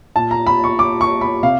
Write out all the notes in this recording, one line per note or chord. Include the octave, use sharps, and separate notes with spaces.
A#2 A5
A#5
B5
C#6
D6
C#6
B5
C3 F5